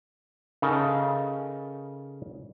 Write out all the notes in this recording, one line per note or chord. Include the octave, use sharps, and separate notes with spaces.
C#3 D#4 A4 A#4